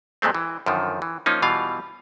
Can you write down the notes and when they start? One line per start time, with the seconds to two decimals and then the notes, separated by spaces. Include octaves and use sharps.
0.22 F2 A#2 G#3 A3 C4
0.35 E3
0.66 F#2 D3 D#3 F3
1.02 E3
1.26 F3 A#3 C#4 D#4
1.42 B2 E3 G3 F4 F5